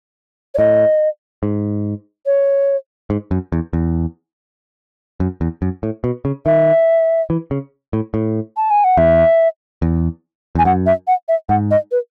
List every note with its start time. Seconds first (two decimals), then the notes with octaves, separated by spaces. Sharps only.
0.54 C#5
0.58 A2 D#5
1.43 G#2
2.26 C#5
3.10 G#2
3.31 F#2
3.52 E2
3.73 E2
5.20 F#2
5.41 E2
5.62 F#2
5.83 A2
6.04 B2
6.25 C#3
6.46 D#3 E5
7.30 E3
7.51 C#3
7.93 A2
8.14 A2
8.57 A5
8.70 G#5
8.84 F#5
8.97 E2 E5
9.82 E2
10.55 E2 G#5
10.65 F#2 F#5
10.86 E5
11.07 F#5
11.28 E5
11.49 G#2 F#5
11.71 D#5
11.92 B4